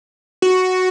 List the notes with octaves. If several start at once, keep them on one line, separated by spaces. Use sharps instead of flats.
F#4